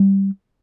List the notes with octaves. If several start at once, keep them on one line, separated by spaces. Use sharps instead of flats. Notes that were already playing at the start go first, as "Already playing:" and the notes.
Already playing: G3